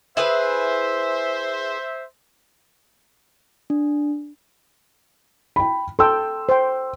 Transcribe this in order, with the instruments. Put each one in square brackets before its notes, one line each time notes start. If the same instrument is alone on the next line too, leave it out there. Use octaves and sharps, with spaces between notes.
[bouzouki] E4 G#4 B4 [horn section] C5 E5
[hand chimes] D4
[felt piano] G5 B5
[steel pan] A4 G5 [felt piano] C6 E6
[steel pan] C5 G5